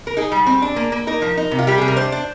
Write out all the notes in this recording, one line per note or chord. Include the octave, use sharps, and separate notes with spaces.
A#4
D#4 G#4
G3
C4
D4
A#3
A#3
D#4 A#4
F3
D#4
C3
F4
G3 G4
C3 G#4
A#4
D4 C5
D4